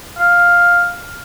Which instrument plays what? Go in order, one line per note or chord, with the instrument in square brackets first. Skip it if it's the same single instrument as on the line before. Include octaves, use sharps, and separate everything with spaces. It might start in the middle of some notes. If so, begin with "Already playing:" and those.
[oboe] F5